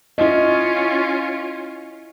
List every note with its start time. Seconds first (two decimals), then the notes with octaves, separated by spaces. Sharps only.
0.18 C#4 E4 F4 D#5